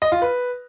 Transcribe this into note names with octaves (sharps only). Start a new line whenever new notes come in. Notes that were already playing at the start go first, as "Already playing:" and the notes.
D#5
F4
B4